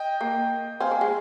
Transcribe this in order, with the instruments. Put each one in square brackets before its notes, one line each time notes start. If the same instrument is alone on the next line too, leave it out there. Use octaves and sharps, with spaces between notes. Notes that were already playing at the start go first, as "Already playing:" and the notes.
Already playing: [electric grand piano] D#5 G5
[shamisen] A#3
[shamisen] C4 [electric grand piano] F5 G#5
[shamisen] A#3
G#3